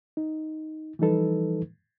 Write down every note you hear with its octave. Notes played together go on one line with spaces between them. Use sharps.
D#4
E3 F3 G3 D#4 A4 B4